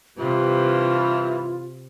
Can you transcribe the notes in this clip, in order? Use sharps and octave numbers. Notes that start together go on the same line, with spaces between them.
G2 C3 E3 F4